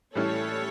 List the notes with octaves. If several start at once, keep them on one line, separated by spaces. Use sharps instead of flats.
A2 E3 G3 C#4 E4 A4 C#5